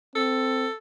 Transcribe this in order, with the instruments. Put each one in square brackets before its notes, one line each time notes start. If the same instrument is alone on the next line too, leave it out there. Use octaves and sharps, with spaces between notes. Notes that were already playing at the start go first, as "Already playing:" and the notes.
[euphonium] C4 [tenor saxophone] A4